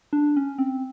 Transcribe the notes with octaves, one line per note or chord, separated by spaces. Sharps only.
D4
C#4
C4